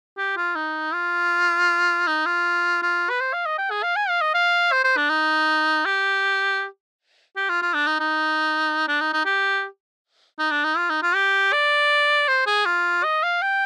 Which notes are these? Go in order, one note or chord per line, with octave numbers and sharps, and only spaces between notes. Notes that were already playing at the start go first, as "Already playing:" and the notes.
G4
F4
D#4
F4
D#4
F4
F4
B4
C5
F5
D#5
G5
G#4
F5
G#5
F5
D#5
F5
C5
C5
D4
D#4
G4
G4
F4
F4
D4
D#4
D#4
D4
D#4
D#4
G4
D#4
D4
D#4
F4
D#4
F4
G4
D5
C5
G#4
F4
D#5
F5
G5